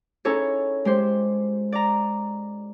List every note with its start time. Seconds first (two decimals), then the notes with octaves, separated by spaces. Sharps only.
0.25 C#4 D#4 E4 G#4 A4 C#5
0.85 G#3 G4 C5
1.72 D5 A#5